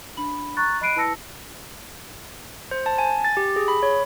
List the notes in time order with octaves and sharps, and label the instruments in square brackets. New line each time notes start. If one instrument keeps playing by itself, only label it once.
[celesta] D4 B5 F#7
A#5 C#6 F#6 A6
D#5 B5 F#6 C7 D7 D#7
E4 B4 A5 E6 A#6 C#7
[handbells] C5
A5
G#5
A6
G4
G#4
B5
C#5